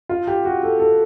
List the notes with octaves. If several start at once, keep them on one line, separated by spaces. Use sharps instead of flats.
F4
G4
F#4
A4
A4